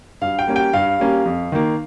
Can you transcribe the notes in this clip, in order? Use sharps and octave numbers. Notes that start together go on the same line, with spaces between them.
G2 F5
G5
G3 A#3 C#4
G5
G2 F5
G3 A#3 C#4
F2
D#3 A#3